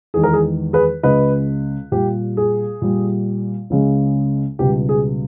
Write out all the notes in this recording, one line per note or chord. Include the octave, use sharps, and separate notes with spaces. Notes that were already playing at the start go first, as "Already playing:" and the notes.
E2 D#3 G#3 G#4
A#4
G#4
G#4 B4
C#2 C#3 G#3 B4 D#5
A#2 G3 G4
G#4
A#2 G3
C#2 C#3 G#3
C#2 B2 G3 G4
G#4